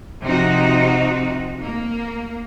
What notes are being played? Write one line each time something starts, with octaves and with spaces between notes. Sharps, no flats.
C3 F3 D#4 F#4
A#3